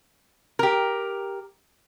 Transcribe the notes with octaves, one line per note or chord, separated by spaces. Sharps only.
G4 A#4